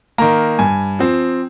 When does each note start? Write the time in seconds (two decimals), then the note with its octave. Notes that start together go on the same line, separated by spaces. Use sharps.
0.18 D#3 A#3 A#5
0.59 G2 G#5
0.99 F3 C4